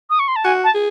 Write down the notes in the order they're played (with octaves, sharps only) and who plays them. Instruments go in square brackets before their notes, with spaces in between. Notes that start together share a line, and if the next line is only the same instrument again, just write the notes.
[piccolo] D#6
C#6
C6
A5
[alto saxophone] F#4 [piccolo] G#5
[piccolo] A5
[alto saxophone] G#4